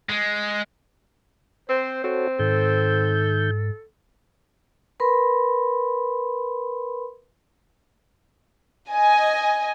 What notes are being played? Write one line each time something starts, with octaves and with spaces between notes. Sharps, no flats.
G#3
C4 C5
C4 F#4 A4 C#5
G#2 D#3 A4 G6
A#4 B4 B5 C6
D#5 G#5